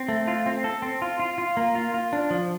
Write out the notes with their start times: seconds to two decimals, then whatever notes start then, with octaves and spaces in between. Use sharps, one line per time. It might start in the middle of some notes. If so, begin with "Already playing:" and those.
Already playing: C4
0.09 A3
0.28 F4
0.46 C4
0.64 A4
0.82 C4
1.02 F4
1.20 F4
1.38 F4
1.57 A#3
1.75 F4
1.94 F4
2.13 D4
2.31 F3